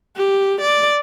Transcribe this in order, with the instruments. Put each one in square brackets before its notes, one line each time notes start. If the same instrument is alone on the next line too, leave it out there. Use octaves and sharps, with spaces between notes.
[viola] G4
D5